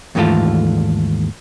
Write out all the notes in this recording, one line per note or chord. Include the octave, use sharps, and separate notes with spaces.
D#2 G#2 E3 A3 F4 A4